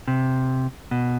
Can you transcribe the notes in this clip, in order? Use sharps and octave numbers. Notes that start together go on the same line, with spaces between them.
C3
B2